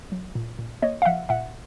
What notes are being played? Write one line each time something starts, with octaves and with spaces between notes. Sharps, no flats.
F#3
A#2
A#2
A#3 C#5 D#5
F5
F3 E5 F#5
A#2 E5 F#5